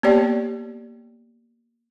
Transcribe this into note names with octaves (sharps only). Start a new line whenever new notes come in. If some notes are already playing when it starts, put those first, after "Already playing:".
A#3 B3 G4 C#5 D5 G5